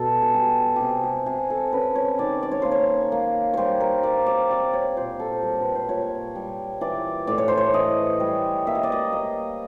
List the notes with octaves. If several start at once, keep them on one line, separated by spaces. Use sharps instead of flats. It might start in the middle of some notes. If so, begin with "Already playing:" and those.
Already playing: B2 A4
G#4
G3 G4
C3 G4 G#4
G4
C3 G#4
A4
C#4 B4
C#5
D#3 D5
D5
C#5
A#3 C5
C#5
A#3
G3 C5 C#5
A#4
A#3 D5
D5
C4 D5
C#5
A#2 C5
A4
G3 A#4
B4
C5
A#2 C#5
G3
E3 D5
A2 D5
C#5
C5
C#5
E3 D#5
G3
A#3 E5
D#5
D5
D#5
A#3 D#5